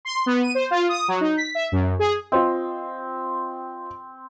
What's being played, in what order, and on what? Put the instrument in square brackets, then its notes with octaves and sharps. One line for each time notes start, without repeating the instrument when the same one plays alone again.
[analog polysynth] C6
B3
D#7
C5
F4
D#6
F#3
D#4
B6
E5
F#2
G#4
[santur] C4 [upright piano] F4 C5 D#5